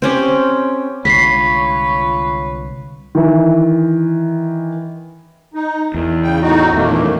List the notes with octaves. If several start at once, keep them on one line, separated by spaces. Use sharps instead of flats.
C4 C#4 G4
C2 D3 G#3 F4 B4 C#5 B6 C7
D#3 E3
D#4
E2 D#3
C#3 G5
A2 D#4 F#4
E2 A#2 D#3 A3 A#3